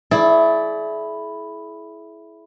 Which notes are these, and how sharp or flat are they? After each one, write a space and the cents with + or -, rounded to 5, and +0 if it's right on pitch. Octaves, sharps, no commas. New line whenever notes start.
E4 +0 G#4 +40 D5 +0